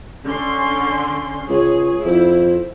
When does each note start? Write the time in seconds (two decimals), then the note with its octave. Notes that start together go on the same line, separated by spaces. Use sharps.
0.24 D3 C#4 C6
1.49 C#2 G#4 C#5
2.05 F2 E4 C5